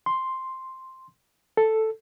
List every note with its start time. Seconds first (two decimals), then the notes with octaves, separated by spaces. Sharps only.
0.06 C6
1.57 A4